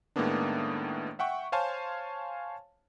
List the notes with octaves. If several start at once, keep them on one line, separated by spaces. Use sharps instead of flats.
A2 D#3 G#3 A#3 B3 D4
E5 F#5 G5 C#6
C5 C#5 F5 G#5 A5 C6